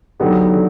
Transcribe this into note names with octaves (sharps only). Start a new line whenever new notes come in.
D3 F#3 B3 D#4 G4
D3